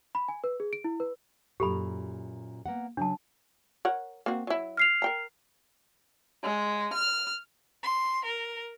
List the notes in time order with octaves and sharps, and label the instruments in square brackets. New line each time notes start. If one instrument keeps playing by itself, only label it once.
[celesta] B5
G#5
B4
G#4
D7
E4
B4
[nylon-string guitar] F#2 A#2 [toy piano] G4 A4 B5
[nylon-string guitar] A#3 B3 F#5
[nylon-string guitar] C#3 F#3 [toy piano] D4 A5
[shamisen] A#4 C#5 F#5
A#3 C4 F#4
F#3 E4
[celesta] F6 C7 F7
[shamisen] A#4 G5 A#5
[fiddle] G#3
F6
[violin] C6
A#4